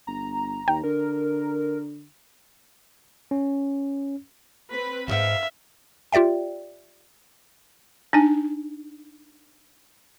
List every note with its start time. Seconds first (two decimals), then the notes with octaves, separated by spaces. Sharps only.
0.07 G1 A#5
0.68 D#2 G5
0.84 D3 A#4
3.31 C#4
4.70 C4 B4 B5
5.08 D2 G#2 E5 F5
6.12 F4 G4 D5 E5 G5
8.13 D4 D#4 G#5